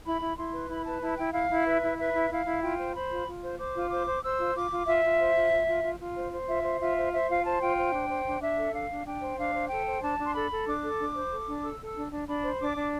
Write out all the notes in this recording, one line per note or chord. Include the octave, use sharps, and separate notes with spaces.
E4 B5
E4
E4 C6
B4
E4 B5
B4 A5
E4 A5
E4 G5
E4 F5
E4
B4 E5
E4
B4 E5
E4
E4 F5
E4
F4 G5
C5
C5 B5
F4
F4
C5
C5 D6
F4
C5 D6
C5
C5 E6
F4
F4 D6
F4
F4 E5
F4
C5
F4
F4
F4
F4
F4
C5
C5
F4 E5
C5
F4 E5
C5
C5 E5
F4 F5
C5 A5
F4 G5
C5
D4
C5
D4
D4 E5
A4
D4 F5
D4
D4 G5
C5
D4 F5
C5
A4 G5
C5
D4 A5
D4 C6
A4 B5
A4
D4 D6
A4
D4
C5
A4
D4
A4 E6
A4
E6
D4
D4
D4 B5
C5
D4 D6
D4